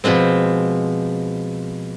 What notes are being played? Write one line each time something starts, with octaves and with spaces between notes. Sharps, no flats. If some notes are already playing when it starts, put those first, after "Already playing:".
B2 F3 G#3 C4